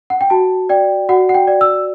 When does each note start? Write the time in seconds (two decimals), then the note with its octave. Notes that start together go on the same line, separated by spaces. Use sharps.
0.10 F#5
0.21 G5
0.30 F#4 A5
0.69 D5 G5
1.09 F#4 F#5
1.29 F#5
1.34 G5
1.47 D5
1.61 E6